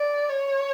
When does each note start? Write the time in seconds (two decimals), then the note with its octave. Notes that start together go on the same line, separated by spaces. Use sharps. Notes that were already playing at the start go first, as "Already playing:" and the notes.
Already playing: D5
0.29 C#5